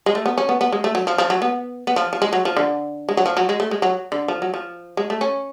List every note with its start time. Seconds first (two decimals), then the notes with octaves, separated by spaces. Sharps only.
0.06 G#3
0.15 A3
0.26 B3
0.38 C#4
0.49 B3
0.61 B3
0.72 G#3
0.84 A3
0.95 F#3
1.07 F3
1.18 F3
1.30 F#3
1.42 B3
1.87 B3
1.96 F3
2.13 F3
2.22 G#3
2.33 F#3
2.45 F3
2.57 D3
3.09 G#3
3.17 F#3
3.26 F3
3.37 F#3
3.49 G#3
3.60 A3
3.71 G#3
3.82 F#3
4.12 D3
4.28 F3
4.42 F#3
4.54 F3
4.97 G#3
5.10 A3
5.21 C#4